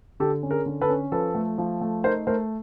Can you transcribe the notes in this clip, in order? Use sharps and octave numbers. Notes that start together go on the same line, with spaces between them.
D3 G4 A4
C#4
G#4 A#4
D3
A4 B4
C#4
F3 A4 B4
A3
F3
A3
D#4 A#4 C5
A3 A#4 C5